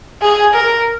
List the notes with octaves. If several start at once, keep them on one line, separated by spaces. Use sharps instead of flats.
G#4
A#4